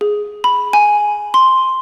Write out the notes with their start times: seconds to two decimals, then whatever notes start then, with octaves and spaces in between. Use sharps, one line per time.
0.01 G#4
0.44 B5
0.73 G#5
1.34 C6